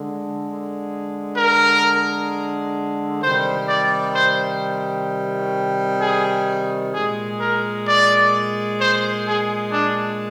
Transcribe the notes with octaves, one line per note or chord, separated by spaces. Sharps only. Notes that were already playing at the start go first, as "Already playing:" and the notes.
Already playing: D3 G#3
A#4
C3 D#3 G3 C5
D5
C5
G#4
A#2 G#3 G#4
A#4
D5
C5
G#4
D4